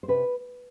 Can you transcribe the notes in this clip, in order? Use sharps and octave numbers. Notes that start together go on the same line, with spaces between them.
C5
C3 B4